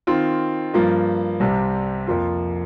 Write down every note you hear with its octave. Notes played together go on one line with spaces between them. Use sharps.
D#3 C4 F4
G2 F3 A#3 F4
C2 C3 G3 C4
F2 F3 A#3 F4